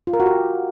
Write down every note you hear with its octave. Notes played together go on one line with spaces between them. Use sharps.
F4
A#4
F#4
G4